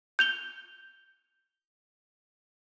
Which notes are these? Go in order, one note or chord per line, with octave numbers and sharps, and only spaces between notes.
G6 F7 G7